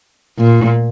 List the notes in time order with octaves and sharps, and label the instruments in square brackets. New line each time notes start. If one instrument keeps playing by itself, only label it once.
[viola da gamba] A#2